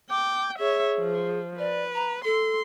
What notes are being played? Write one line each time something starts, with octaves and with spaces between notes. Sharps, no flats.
G5 D6
G#4 C#5 E5
F3
B4 D5
A#5
A4 C6